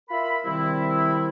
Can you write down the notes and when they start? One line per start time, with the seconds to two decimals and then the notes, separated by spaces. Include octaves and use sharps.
0.10 F4 A#4 E5 B5
0.44 C3 D#3 G3 C4 E4